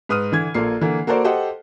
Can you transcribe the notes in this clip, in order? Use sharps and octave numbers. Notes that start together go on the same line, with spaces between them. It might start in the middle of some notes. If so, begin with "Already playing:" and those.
G#2 B4 D#6 F6 D#7
D3 E3 G#6
A#1 A#3 F4 A4 C7
D3 E3 A#3
A#3 F#4 A4 A#4 C5 D5
G4 A4 C5 D#5 F#5